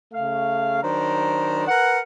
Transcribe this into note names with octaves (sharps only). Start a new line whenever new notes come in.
C#3 A3 F5
D#3 F#3 D4 C5 A#5
A#4 B4 F#5